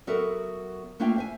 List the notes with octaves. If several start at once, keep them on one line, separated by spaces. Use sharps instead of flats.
F#3 B3 F#4 A4 A#4 E5
A3 A#3 D4 F4 E5 G5
C5 E5 G#5